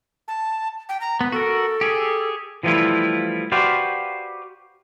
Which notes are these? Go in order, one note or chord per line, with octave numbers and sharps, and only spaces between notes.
A5
G5
A#5
B3 B4
F#4 A4 A#4
G4 G#4
E3 F3 G3 A3 E4 F4
F#4 G4 B4 C5 D5 F5